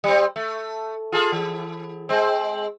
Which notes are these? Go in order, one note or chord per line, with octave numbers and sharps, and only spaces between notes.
G3 C4
A3
F4 G#4 A4
E3
G#3 C4